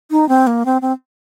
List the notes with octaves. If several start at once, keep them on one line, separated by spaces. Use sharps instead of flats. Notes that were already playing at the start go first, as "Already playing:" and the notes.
D#4
C4
A#3
C4
C4